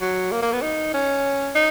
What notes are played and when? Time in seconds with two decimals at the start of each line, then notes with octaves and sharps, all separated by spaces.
0.01 F#3
0.32 A#3
0.42 A#3
0.52 B3
0.62 D#4
0.94 C#4
1.55 D#4